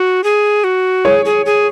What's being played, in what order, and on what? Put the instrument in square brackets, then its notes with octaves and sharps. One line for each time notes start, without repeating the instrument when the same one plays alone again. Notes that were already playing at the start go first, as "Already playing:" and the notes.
Already playing: [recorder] F#4
G#4
F#4
[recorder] G#4 [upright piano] C#5
[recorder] G#4
G#4